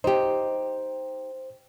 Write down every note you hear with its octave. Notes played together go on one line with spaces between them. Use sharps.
D#4 G4 C5